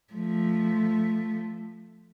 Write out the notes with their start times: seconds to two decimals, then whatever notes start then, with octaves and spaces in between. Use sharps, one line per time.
0.13 F3 A3